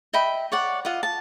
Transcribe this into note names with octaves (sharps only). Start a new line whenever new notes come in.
D#5 E5 G5 B5
C#5 D5 F#5
F4 D#5 F#5
A5